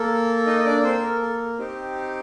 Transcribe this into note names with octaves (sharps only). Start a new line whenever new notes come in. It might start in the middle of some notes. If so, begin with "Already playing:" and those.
Already playing: A#3 A4
D#4 D#5
D#5
D4 D5
C4 C5
A#4
A4
C4 D#4 G4